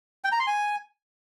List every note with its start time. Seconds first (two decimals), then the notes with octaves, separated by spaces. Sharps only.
0.24 G5
0.32 A#5
0.40 C6
0.47 G#5